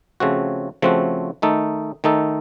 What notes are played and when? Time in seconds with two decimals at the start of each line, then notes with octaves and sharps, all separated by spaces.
0.20 C#3 F3 A3 C4 F#4
0.82 C#3 F3 A3 C4 F#4
1.42 D#3 A3 D#4 A4
2.04 D#3 A3 D#4 A4